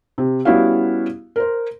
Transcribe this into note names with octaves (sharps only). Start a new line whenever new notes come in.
C3
G3 B3 C#4 E4 F#4 F5
A#4 C5